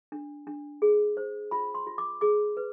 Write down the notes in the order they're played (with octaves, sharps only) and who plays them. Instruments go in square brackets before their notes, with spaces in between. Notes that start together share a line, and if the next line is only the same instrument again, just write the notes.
[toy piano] D4
D4
G#4
C5
F4 B5
C6
F4
D6
G#4 D6
B4